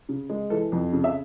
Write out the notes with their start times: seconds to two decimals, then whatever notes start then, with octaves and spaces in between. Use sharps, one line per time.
0.09 C#3
0.30 G#3
0.50 E3 A4
0.72 F2
0.93 C#3
1.04 E5